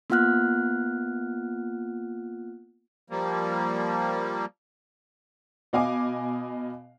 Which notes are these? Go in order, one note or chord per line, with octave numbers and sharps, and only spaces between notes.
A#3 B3 F4 F#5 F6 F#6
F3 G3 A#3
B2 D#5 F5 G#5 D6